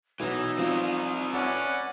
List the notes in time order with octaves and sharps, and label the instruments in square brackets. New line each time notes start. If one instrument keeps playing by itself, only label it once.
[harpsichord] B1 B3 [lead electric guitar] E3 [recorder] D#4
[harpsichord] F3 [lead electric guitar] C4 E4
[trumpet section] C#4 B4 D5 [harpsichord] A4 [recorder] F#5